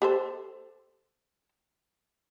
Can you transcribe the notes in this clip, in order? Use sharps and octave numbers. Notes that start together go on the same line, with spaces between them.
G4 A4 C5